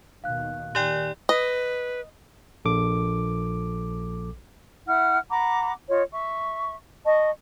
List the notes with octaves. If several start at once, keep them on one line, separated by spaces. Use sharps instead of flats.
D#2 B2 D#3 F5 F#6
A#2 D#3 G4 D5 G5 G#5 F#6 F#7
B4 D#5
A#1 A4 D6
E4 F#5 F6
F#5 A#5 B5 D6
F4 C#5 D#5
E5 C#6
D#5 A5 C#6